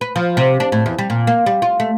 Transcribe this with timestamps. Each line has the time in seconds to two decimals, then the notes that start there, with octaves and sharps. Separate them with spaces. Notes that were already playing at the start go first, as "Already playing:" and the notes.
0.01 B4
0.16 F3
0.37 C3
0.60 D4
0.72 A2
0.86 E2
0.98 G3
1.10 A#2
1.27 A#3
1.46 G3
1.62 F4
1.80 A3